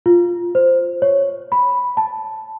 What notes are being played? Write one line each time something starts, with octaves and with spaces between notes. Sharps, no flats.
F4
C5
C#5
B5
A5